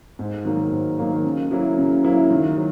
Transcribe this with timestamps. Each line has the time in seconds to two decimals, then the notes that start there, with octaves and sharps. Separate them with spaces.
0.19 G#2
0.45 D#3 F#3 A#3
0.72 G#2
0.99 D#3 F#3 A#3
1.24 C#3
1.51 F#3 A#3 E4
1.77 C#3
2.04 F#3 A#3 E4
2.30 D#3
2.57 F#3